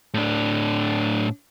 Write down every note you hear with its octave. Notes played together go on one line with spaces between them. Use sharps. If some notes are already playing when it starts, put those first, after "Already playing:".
A2 D4